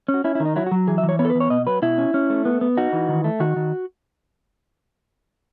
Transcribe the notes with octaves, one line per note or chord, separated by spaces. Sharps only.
C#4
F#4
C#4 E4
E4
D#3
D#4
F#3 E4
F#4
F#3
E3 G#4
E5
E3
C#5
B3 C#5
A4
B4
E3
C#5
B2 D#5
F#3 B4
B2 E4
C#4
C#4
A3
B3
B3
D#4 F#4
E3
D#3
A3
D#3 F#4
D#3